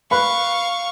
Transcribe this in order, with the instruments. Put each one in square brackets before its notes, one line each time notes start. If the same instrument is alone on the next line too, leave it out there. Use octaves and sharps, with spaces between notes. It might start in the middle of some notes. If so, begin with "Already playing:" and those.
[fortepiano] B4 B5 [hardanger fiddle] F5 C#6